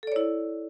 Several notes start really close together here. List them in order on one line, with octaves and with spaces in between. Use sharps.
A4 D5 C#5 E4